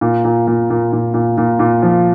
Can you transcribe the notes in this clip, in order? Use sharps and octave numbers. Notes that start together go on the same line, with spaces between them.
A#2
A#2
A#2
A#2
A#2
A#2
A#2
A#2
F3